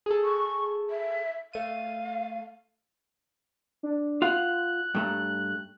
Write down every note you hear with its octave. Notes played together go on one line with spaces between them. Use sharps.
G#4 A4
C#6
E5
A3 F5 D#7
D4
F4 F5 F#5 F#6
G2 A3 A#5